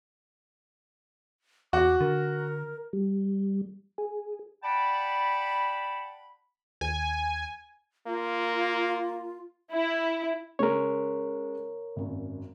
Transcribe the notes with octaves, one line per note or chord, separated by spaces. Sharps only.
E2 F#4 D6
D3 A#4
G3
G#4
D5 F#5 G5 A5 B5
D#2 G#5
A#3 F4
E4
C#3 G#3 A#4 C#5
G#1 F#2